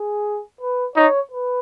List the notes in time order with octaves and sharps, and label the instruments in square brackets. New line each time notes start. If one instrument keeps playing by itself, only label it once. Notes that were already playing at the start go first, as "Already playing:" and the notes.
Already playing: [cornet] G#4
B4
[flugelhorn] D#4 [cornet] C#5
[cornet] B4